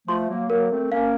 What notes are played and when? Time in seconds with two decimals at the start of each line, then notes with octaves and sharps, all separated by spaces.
0.08 F3 A3 C6
0.29 F#3 A#3
0.49 F#3 A#3 A#4
0.71 A3 C4
0.91 A#3 C#4 F5